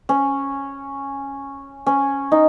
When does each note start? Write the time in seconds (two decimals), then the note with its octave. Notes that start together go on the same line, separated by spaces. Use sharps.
0.09 C#4
1.86 C#4
2.32 D#4